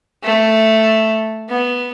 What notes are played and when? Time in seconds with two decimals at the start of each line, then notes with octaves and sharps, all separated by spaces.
0.24 A3
1.49 B3